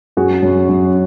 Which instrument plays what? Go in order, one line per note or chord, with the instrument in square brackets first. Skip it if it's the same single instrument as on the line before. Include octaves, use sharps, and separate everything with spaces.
[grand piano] F#2 F#4 G#4
F#2
F#2